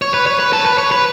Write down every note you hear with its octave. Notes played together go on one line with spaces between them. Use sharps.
C#5
B4
C#5
B4
A4
B4
C#5
B4